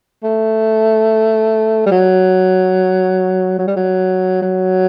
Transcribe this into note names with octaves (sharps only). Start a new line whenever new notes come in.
A3
G3
F#3
F#3
G3
F#3
F#3